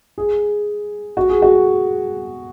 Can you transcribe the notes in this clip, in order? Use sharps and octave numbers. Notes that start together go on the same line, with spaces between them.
G#4
F#4
G#4
F#4